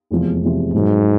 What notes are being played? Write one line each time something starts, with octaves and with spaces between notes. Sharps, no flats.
F1 E2 C3 F3 G#3
F1 E2 C3 F3 G#3
G#2 B2 F#3 B3